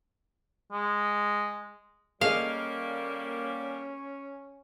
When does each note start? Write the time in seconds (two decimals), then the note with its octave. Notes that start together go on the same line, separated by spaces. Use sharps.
0.72 G#3
2.21 G3 A#3 C#4 G#4 A4 D#5 F5